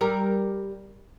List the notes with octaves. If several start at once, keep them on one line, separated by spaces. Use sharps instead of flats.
G3 A#4